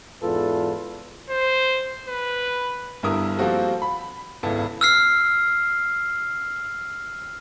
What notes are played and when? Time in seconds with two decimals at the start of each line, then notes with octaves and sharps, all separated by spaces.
0.22 E2 G#2 F4 A4 B4
1.30 C5
2.08 B4
3.03 G1 G2 E4 A#4 D#6
3.38 F3 G3 A#3 C4 F#4 A4
3.82 B5
4.43 G#1 C#2 B3 E4 A4 A5
4.81 E6 F6 C7